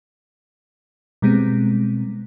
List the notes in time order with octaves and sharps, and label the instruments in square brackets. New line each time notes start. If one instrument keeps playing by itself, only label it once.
[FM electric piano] B2 G3 G#3 B3 C4